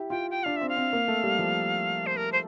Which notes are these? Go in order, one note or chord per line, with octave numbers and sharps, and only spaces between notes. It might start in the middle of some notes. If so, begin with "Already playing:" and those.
Already playing: E4 G4
F4 G5
G5
D4 F5
C4 E5
F5
C4
A#3
A3
G3
F3
C5
A#4
C5